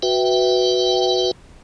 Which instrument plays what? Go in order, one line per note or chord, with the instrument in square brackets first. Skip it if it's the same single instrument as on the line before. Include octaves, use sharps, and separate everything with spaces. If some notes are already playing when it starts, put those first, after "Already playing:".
[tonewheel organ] F#4 B4 E5 G5